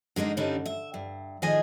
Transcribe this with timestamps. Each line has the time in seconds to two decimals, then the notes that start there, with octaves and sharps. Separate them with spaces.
0.16 D3 G#3 A#3 D#4
0.37 G2 D3 G3 C#4 D#4
0.66 E5
0.94 G2
1.42 A2 D#3 F3 G#4 D#5 G#5